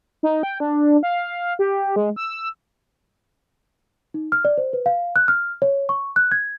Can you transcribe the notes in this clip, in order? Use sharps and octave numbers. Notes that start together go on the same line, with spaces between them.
D#4
G5
D4
F5
G4
G#3
E6
D#4
F6
D5
C5
B4
F5
F#6
F6
C#5
C#6
F#6
G#6